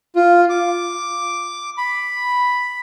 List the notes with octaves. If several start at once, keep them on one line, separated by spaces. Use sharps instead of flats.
F4
D6
B5